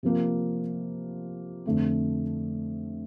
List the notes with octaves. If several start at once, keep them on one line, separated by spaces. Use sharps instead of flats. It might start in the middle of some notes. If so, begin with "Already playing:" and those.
C3 F3 A#3 F4
F2 D3 A3 C4